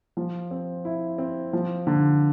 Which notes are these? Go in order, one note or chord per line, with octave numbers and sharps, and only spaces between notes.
F3
C4
E4
C4
F3
D3